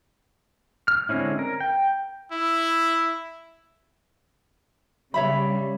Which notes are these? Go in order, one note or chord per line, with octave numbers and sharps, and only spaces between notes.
F6
D3 G#3 C4 C#4 E4
A#4
G5
E4
C#3 G3 C#5 E5 B5